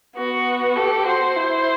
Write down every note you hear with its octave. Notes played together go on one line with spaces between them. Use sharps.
B3 F#4
G4 A4
F#4 C5
E4